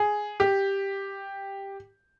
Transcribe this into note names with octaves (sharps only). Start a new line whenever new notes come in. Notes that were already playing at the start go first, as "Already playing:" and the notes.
Already playing: G#4
G4